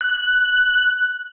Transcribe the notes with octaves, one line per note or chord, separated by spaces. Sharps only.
F#6